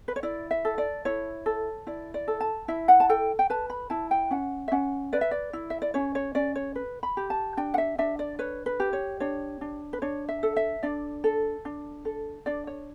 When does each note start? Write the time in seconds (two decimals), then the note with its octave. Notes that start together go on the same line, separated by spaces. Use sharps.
0.08 B4
0.16 C#5
0.23 E4 D5
0.51 E5
0.65 A4
0.78 D5
1.05 E4 C#5
1.46 A4
1.87 E4 D5
2.14 D5
2.28 A4
2.40 A5
2.68 E4 E5
2.88 F#5
3.00 A5
3.09 A4 G5
3.39 G5
3.50 B4 A5
3.70 B5
3.90 E4 A5
4.11 G5
4.31 C#4 F#5
4.68 E5
4.72 C#4 F#5
5.13 B4 D5
5.21 E5
5.31 D5
5.53 E4
5.70 E5
5.82 D5
5.94 C#4 C#5
6.15 C#5
6.35 C#4 D5
6.55 C#5
6.75 B4
7.03 B5
7.17 G4
7.30 A5
7.57 D4 G5
7.74 F#5
7.78 E5
7.98 D4 E5
8.19 D5
8.39 B4 C#5
8.66 B4
8.80 G4
8.93 C#5
9.20 D4 C#5
9.61 D4
9.93 B4
10.02 D4 C#5
10.29 E5
10.43 A4
10.56 E5
10.83 D4 D5
11.24 A4
11.65 D4
12.05 A4
12.46 D4 D5
12.67 C#5